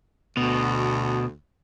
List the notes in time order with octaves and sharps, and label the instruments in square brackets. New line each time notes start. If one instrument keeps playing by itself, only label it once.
[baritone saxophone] D2 [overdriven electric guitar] B2